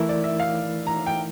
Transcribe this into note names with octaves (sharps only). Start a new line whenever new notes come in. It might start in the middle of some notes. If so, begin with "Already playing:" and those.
Already playing: E3 A3 E4 A#4 E5
D5
E5
F5
A#5
G5